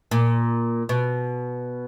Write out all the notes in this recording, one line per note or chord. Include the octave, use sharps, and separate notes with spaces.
A#2
B2